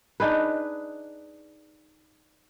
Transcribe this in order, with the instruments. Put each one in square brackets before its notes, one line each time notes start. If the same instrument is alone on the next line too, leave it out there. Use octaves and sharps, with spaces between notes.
[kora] D4 D#4 G#4 B4